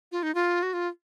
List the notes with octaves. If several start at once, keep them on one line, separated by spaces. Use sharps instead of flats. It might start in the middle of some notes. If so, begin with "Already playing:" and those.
F4
D#4
F4
F#4
F4